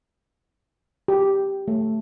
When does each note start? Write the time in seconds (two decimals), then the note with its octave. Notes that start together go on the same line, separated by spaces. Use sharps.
1.08 G4
1.68 A3